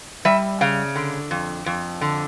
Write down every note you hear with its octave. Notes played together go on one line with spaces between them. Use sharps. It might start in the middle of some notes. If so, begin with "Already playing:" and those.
G3 E5
C#3 F5
D3
F2
F2
D3